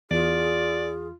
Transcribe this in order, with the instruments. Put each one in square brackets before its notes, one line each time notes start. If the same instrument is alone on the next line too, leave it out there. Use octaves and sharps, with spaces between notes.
[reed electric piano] E2 [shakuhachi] F4 [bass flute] G#4 [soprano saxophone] D5